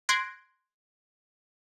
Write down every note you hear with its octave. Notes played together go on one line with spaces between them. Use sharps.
C6 F#6 G#6 A#6 C7 D7